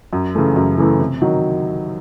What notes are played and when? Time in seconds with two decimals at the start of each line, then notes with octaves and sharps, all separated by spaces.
0.13 F#2
0.35 C#3 E3 A3
0.56 F#2
0.78 C#3 E3 A3
1.00 C3
1.22 D#3 F#3